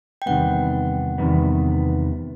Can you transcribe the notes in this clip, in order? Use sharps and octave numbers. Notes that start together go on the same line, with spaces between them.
G5
E2 C3 D#3 G3 B3 F#5
E2 C3 D#3 G3 B3